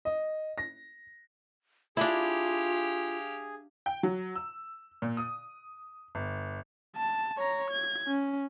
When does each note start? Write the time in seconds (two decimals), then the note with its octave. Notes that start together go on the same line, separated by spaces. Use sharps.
0.05 D#5
0.58 A#6
1.97 D4 E4 F4 G4 G#4 F5
3.86 G5
4.03 F#3
4.36 E6
5.02 A#2
5.17 D#6
6.15 G1
6.97 A5
7.38 C#5 A#5
7.71 G#6
8.07 C#4